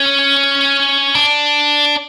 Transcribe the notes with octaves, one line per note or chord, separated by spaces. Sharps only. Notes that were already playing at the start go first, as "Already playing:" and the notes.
Already playing: C#4
D4